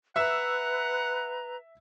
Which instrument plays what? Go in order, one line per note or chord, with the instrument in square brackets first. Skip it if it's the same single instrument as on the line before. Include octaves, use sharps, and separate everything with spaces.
[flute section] B4 A#5 [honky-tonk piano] E5 E6 E7 [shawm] F#5